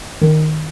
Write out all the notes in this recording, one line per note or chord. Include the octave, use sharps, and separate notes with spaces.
D#3